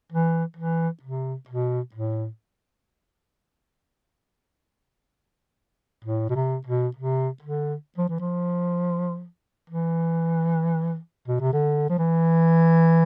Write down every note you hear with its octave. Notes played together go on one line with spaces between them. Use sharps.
E3
E3
C3
B2
A2
A2
B2
C3
B2
C3
D3
F3
E3
F3
E3
B2
C3
D3
F3
E3